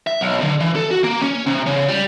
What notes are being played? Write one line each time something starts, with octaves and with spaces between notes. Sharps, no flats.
E5
B1
D3
E3
A4
F#4
A#3
C#4
C3
C#3
G3